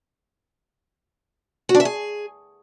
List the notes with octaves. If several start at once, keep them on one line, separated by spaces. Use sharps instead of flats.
F#4
D4
E5
G#4